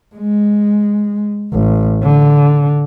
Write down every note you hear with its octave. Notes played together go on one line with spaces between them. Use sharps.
G#3
A1
D3